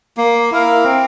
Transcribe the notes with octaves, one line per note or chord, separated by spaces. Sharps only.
A#3
E4 A#4 F5
C4